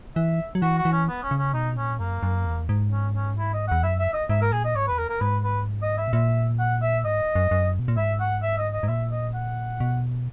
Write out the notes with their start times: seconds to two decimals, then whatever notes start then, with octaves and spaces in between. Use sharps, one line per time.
0.16 E3 E5
0.55 F#3
0.62 E3 F#4
0.78 F#4
0.85 E3
0.92 C#4
1.08 B3
1.23 C#4
1.31 C#3
1.38 C#4
1.54 B2 D#4
1.77 A#2 C#4
1.99 F#2 A#3
2.23 F#2
2.46 E2
2.69 G#2
2.91 C#4
3.14 C#4
3.38 E4
3.53 D#5
3.68 E2 F#5
3.83 F#2 E5
3.99 E5
4.14 D#5
4.29 G#2 E5
4.41 A#4
4.52 A#2 G#4
4.64 D#5
4.75 G#2 C#5
4.87 E2 B4
4.98 A#4
5.09 A#4
5.21 G#2 B4
5.44 B4
5.82 D#5
5.98 E5
6.08 B2
6.13 A#2 E5
6.59 F#5
6.82 E5
7.05 G#2 D#5
7.35 F#2
7.51 F#2
7.79 B2
7.88 A#2
7.97 G#2 E5
8.20 F#5
8.42 E5
8.58 D#5
8.73 D#5
8.83 G#2
8.88 A#2 E5
9.11 D#5
9.34 F#5
9.80 B2